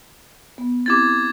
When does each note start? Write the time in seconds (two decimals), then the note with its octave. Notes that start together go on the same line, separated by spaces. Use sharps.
0.58 B3
0.86 C4 E4 G4 D6 G#6 A6